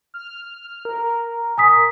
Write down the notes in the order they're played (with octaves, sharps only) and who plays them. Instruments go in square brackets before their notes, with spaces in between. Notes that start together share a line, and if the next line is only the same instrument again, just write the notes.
[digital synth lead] F6
A#4
[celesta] G#5 D#6 B6